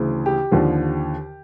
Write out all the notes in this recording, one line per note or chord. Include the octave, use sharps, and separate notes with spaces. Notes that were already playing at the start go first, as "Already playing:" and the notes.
Already playing: D2 C#3 E3
G4
D#2 D3 F3